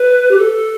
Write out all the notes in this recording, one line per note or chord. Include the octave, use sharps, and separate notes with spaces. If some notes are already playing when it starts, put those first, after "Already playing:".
Already playing: B4
G4
A4